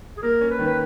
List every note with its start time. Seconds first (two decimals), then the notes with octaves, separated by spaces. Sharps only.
0.17 G#4
0.22 A#3 A#4
0.41 C#4
0.50 B4
0.59 D#3
0.67 B4